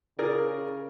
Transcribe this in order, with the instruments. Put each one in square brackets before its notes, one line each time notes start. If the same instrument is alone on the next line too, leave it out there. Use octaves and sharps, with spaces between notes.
[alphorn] C#3 [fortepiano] G#4 A#4 D5